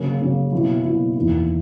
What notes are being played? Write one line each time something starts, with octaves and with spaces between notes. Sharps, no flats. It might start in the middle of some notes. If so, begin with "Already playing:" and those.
Already playing: C#3 F#3 A#3
C#3 F#3 A#3
B2 F#3 A#3 E4
B2 F#3 A#3 E4
E2 D#3 A#3 E4